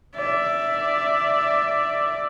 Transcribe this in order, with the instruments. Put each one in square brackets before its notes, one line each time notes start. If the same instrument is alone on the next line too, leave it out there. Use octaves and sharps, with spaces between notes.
[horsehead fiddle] D5 E5